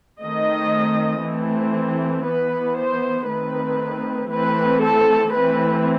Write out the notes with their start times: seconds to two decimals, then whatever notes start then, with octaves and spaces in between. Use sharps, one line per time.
0.20 D#3 A3 C4 D#5
1.23 E3 A3 C4
2.25 E3 B3 B4
2.76 C5
3.27 D#3 A3 C4 B4
4.30 E3 A3 C4 B4
4.82 A4
5.33 E3 A3 C4 B4